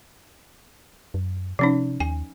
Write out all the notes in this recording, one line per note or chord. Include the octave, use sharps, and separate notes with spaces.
F#2
C3 F3 C#4 D#4
D#2 G#5